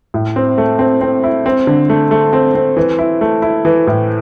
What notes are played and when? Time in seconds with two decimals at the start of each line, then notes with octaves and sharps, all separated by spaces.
0.14 A2
0.36 C4
0.58 A3
0.79 C4
1.01 C4
1.24 E4
1.46 C4
1.67 D3
1.89 A3
2.11 A3
2.33 C4
2.55 C4
2.77 E3
2.99 E4
3.21 A3
3.42 E4
3.65 E3
3.87 A2